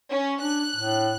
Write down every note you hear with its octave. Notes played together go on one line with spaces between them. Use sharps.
C#4
D4 F#6
A2